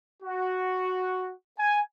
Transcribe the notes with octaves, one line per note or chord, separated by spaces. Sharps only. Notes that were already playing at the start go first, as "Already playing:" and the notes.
F#4
G#5